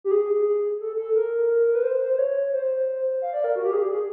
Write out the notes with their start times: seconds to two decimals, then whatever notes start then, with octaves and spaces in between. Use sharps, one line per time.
0.04 G4
0.11 G#4
0.80 A4
0.98 A4
1.15 A#4
1.67 A#4
1.75 B4
1.84 C5
2.01 C5
2.13 C5
2.18 C#5
2.52 C5
3.22 F5
3.33 D5
3.44 A#4
3.56 F#4
3.64 G4
3.73 G#4
3.82 G4
3.91 G#4